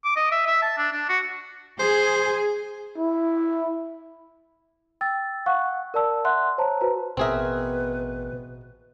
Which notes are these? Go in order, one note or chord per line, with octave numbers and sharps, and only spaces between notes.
D6
D#5
E5
E5
A5
D4
D4
F#4
G#4 C5
E4
G5 E6 A6
F5 F#5 C#6 F#6
A#4 D5 A5 E6
E5 F#5 C6 F#6
C5 C#5 A5 A#5
F#4 B4 C5 A#5
A1 B2 C4 G#4 A#4 B4 E5